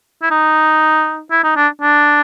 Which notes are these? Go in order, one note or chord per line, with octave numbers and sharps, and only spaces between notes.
E4
D#4
E4
D#4
D4
D4